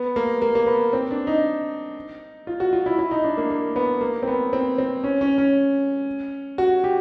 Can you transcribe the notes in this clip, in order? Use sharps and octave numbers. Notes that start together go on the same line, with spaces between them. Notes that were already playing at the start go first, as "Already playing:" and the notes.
Already playing: B3
A#3
A#3
A#3
B3
C4
D4
D#4
F4
F#4
F4
E4
E4
D#4
D4
A#3
A#3
B3
A#3
C4
B3
C4
C4
C#4
C#4
C#4
F#4
G4